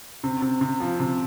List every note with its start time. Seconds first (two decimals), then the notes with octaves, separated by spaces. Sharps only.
0.23 C3
0.42 C3
0.61 C3
0.80 F3
1.00 C3